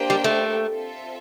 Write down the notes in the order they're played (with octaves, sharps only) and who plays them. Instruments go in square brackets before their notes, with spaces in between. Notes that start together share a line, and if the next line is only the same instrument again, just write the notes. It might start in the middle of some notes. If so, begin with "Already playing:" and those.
Already playing: [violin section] A#3 D4 G4 C5 G5
[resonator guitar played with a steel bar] G3
A3
[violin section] C4 F4 A4 E5